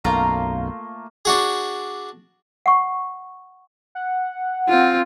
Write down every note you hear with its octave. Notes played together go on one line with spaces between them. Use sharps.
B1 F#2 A3 A#3 F4 F5 A#5
D4 F#4 G#4
F#5 C#6
F#5
C4 F4